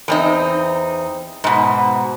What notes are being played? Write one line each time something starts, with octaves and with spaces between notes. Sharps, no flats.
E2 C4 D#4
G#2 B2